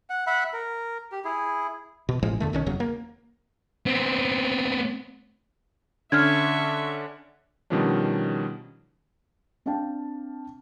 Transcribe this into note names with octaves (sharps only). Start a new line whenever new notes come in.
F#5
E5 F#5 B5
A#4
G4
E4 G#4
B2
A1 A2 F3 G#3
E2 D3 A3
B1 D#3 C#4
F#1 E2 C#3 F#3
A#3
B3 C4
D3 C#4 D4 E5 C#6 F6 G#6
B2 D#3 F3 G3 C#4 D4
C4 D4 F5 G5 A5